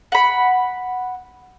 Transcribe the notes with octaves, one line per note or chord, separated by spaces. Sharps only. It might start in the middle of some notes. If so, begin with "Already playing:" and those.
F#5 B5